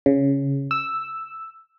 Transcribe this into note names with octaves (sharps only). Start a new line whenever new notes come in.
C#3
E6